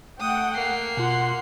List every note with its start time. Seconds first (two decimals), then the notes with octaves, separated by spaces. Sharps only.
0.21 A3 F#5 G5 D#6
0.55 A#3 C7
0.97 B2 F4 F#5 C6